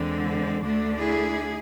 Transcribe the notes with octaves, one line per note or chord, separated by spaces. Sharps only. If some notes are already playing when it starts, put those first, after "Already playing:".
Already playing: E2 D3 G#3 C4
D2 D3 A3 D4
E4 G#4